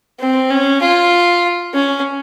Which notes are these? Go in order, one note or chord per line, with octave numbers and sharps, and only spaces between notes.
C4
C#4
F4
C#4